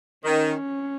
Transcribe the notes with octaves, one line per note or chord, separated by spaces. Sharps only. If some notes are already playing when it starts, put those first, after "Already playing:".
D#3 C#4